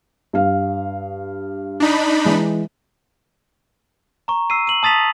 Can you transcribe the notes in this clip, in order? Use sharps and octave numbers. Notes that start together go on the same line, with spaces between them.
G2 F5
D4 D#4 B5
E3 G#3
A#5 C#6
E6 C7 D#7
D#7 F#7
A5 D#6 A6 B6 F7